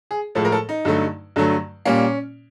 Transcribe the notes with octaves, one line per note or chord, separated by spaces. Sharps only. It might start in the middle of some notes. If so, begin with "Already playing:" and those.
G#4
A2 F3 G#3 A4
A#4
A4
D#4
G2 D3 F#3 A3
G2 D3 F#3 A3
A#2 G3 A#3 C#4